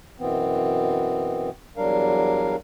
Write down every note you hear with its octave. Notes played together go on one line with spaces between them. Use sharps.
F#2 B2 E3 B3 C4
E2 F#3 G3 D4 A#4 F5